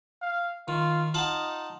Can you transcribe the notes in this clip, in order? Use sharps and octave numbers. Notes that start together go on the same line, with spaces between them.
F5
D#3 F4
D#4 F4 F#5 A5